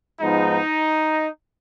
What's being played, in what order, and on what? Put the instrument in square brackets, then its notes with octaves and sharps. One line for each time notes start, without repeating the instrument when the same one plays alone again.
[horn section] G#2 F3 G#3 B3 D#4